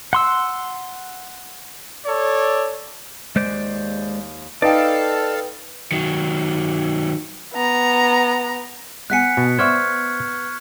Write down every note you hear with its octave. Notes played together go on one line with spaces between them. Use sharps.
F#5 C6 E6
A4 C#5 D5
D#2 G#3 C5 D5
D#4 A4 B4 D5 F5 G5 A5
D#3 F#3
B3 A#5
B3 F#5 G#5 F#6 B6 C#7
B2
B3 C5 D5 E5 C#6 F6 G#6